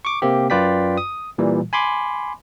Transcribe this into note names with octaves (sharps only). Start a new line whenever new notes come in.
C#6 D6
C3 A#3 C4 G4
F#2 F4 B4 D5 G5 B6
D#6
A#2 E3 G3
G#5 B5 C6 D6